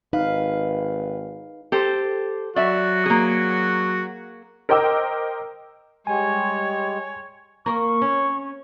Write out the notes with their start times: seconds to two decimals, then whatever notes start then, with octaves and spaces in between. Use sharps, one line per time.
0.13 G#1 D#4 B4 F5
1.72 G4 A4 C5
2.56 F#3 F#4 D5 E5
3.06 A#3 G#4
4.69 A#4 C5 D#5 G5 D6 E6
6.07 G3 G#3 C#5 G#5
7.66 A#3 A#4 C#6
8.02 C#4